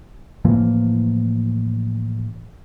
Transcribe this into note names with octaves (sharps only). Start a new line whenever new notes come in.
A2 E3 F3 A#3